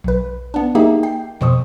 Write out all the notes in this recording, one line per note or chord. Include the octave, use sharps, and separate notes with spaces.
B1 B4
B3 D4
A#3 D#4 G4 G#4 E5
G5 C7
F2 B2 C5 C#6 D#6